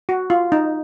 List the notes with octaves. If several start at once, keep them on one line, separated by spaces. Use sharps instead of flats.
F#4
F4
D#4